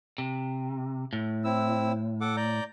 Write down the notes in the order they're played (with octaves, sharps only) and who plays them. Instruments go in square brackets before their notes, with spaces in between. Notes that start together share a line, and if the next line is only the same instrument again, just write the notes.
[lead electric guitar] C3
A2
[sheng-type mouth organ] C4 E4 E6
A4 F#5 D6
D5 A#5 G6